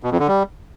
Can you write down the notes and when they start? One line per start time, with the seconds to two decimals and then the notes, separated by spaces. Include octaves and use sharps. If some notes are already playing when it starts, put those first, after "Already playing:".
0.03 B2
0.11 F2
0.20 D3
0.28 G3